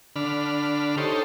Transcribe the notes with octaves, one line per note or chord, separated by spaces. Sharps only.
D3 D4 B5 F6
D#4 G4 A4 C5 C#5